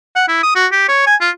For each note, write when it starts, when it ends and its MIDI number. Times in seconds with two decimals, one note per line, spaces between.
0.16 0.24 78
0.28 0.41 64
0.43 0.52 87
0.55 0.66 66
0.72 0.88 67
0.88 1.03 73
1.06 1.15 80
1.21 1.30 65